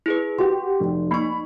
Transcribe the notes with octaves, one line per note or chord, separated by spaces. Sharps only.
E4 G#4 B4
F#4 G4 C6
F1
A#3 D#4 B5 C#6